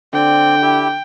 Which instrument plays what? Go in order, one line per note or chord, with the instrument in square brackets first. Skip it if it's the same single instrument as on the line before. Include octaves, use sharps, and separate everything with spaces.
[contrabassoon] D3 [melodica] C4 D5 [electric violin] G5
[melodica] E4 G4